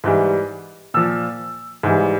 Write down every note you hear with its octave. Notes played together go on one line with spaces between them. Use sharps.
G#2 E3 G3
A#2 F3 E6
G#2 E3 G3